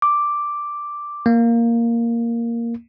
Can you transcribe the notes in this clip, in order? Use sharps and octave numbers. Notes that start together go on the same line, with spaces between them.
D6
A#3